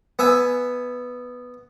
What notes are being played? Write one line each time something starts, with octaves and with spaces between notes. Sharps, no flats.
B3 E5 G#5